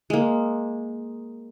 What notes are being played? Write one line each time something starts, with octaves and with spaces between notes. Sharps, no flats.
G#3 A#3